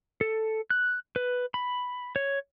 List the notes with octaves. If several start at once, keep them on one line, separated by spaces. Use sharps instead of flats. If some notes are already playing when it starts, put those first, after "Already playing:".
A4
F#6
B4
B5
C#5